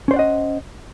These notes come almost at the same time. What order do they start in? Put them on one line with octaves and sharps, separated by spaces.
C#4 C5 D5 F#5 D#5